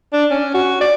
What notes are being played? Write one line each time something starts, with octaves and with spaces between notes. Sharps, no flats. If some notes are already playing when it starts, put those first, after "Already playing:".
D4
C#4
F#4
D5